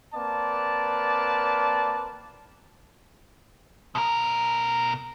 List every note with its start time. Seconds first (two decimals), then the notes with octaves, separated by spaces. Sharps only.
0.14 A#3 C4 B4 D5 A5
3.95 B2 A#4